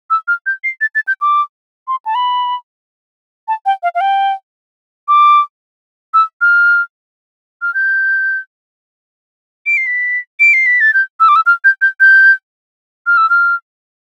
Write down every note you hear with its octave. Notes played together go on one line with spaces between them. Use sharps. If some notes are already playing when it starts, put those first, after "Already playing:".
E6
F6
G6
C7
A6
A6
G6
D6
C6
A5
B5
A5
G5
F5
F5
G5
D6
E6
F6
F6
G6
D7
C7
B6
D7
C7
B6
A6
G6
E6
D6
E6
F6
G6
G6
G6
F6
E6
F6